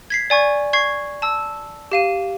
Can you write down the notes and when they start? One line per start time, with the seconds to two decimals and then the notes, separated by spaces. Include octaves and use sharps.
0.10 G#6 B6 C7
0.30 D5 G#5 C#6 G#6
0.73 C#6 G#6 C7
1.22 A5 E6
1.91 G4 F5 D#7